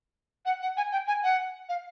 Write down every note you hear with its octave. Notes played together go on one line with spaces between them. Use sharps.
F#5
F#5
G#5
G5
G#5
F#5
F5